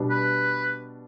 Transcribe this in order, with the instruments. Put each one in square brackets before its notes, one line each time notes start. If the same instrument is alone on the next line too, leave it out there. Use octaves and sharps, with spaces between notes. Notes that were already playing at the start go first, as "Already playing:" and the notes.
Already playing: [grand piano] B2 G3 B3 D4
[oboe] B4